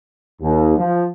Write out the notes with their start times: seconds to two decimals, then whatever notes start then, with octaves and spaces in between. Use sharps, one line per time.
0.41 D#2
0.77 F3